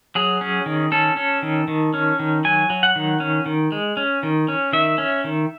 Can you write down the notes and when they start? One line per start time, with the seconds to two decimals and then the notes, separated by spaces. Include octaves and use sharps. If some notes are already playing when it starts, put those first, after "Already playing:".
0.15 F#3 G#4
0.41 C#4
0.66 D#3
0.92 C#4 A4
1.17 C#4
1.42 D#3
1.68 D#3
1.94 C#4
2.19 D#3
2.44 F#3 G#5
2.70 F#3
2.83 F#5
2.96 D#3
3.20 C#4
3.46 D#3
3.72 G#3
3.97 C#4
4.23 D#3
4.48 C#4
4.73 D#3 E5
4.98 C#4
5.24 D#3